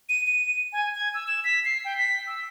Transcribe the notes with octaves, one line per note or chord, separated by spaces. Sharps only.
D#7
D#7
G#5
G#6
E6
E7
B6
C7
G5
B6
E6